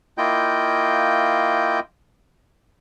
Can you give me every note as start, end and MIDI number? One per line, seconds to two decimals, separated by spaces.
0.18 1.80 58
0.18 1.80 64
0.18 1.80 65
0.18 1.80 75
0.18 1.80 79
0.18 1.80 91